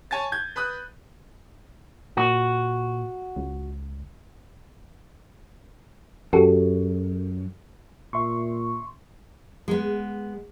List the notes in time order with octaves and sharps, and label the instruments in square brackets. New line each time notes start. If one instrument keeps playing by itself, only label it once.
[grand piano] C#5 G#5 A5 A6
G6 G#6
B4 B5 D#6 F#6
[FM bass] A#2 [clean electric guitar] F#4
[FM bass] C#2
[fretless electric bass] F#2 [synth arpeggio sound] F#4 G4 A4
[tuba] A#2 [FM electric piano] E5 C6 C#6
[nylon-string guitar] G#3 B3